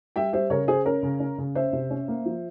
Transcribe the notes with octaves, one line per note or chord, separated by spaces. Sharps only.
G3 E5 G5
G3 C5 E5
C#3 A#4 C#5
C#3 G#4 C5
C#4 A#4 C#5
C#3
C#4
C#3
C#4 C5 E5
C3
C#4
A#3
F3